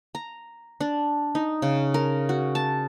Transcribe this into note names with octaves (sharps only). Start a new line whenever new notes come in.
A#5
D4
D#4
C#3
A#4
F#4
A5